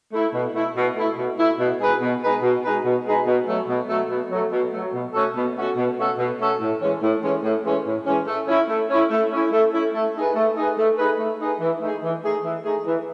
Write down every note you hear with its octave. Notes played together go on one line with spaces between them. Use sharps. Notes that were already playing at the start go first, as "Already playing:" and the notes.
A3 E4
B2
A3 E4
B2
A3 E4
B2
A3 E4
B2
G#3 D#4 G#4 B4
B2
G#3 D#4 G#4 B4
B2
G#3 D#4 G#4 B4
B2
G#3 D#4 G#4 B4
B2
F#3 A3
B2
F#3 A3
B2
F#3 A3
B2
F#3 A3
B2
A3 C#4 F#4 A4
B2
A3 C#4 F#4 A4
B2
A3 C#4 F#4 A4
B2
A3 C#4 F#4 A4
A2
E3 G#3 C#4
A2
E3 G#3 C#4
A2
E3 G#3 C#4
A2
E3 G#3 C#4
A3
C#4 E4
A3
C#4 E4
A3
C#4 E4
A3
C#4 E4
A3
D#4 G#4 B4
A3
D#4 G#4 B4
A3
D#4 G#4 B4
A3
D#4 G#4 B4
E3
A3 D#4 G#4
E3
A3 D#4 G#4
E3
A3 D#4 G#4
E3